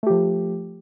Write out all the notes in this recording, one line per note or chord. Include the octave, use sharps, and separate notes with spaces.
F3 A3 G4